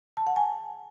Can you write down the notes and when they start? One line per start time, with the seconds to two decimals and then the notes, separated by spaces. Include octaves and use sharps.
0.17 A5
0.27 F#5
0.36 G#5